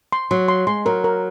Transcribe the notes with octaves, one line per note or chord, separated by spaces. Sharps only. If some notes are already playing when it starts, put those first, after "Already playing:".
C6
F#3 C6
C6
G#3 C6
F#3 A#4
A#4